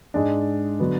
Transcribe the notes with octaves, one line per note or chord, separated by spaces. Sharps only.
G#2 G#3 D4
D3 F#3 B3